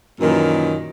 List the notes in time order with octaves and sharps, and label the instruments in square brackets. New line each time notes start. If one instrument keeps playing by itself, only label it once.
[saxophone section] F#2 A#2 D#3 E3